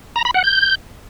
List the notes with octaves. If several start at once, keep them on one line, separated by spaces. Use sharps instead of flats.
A#5
B5
F#5
G6